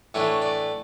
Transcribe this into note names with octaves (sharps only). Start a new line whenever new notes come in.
A2 E3 A3 D4 C#5
D5